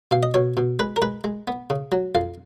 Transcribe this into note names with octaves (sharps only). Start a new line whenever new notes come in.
B2 F5
D#5
B2 C#5
B2
G#3 B4
A#4
G#3 B4
G#3
B3
C#3
F#3
F2 F5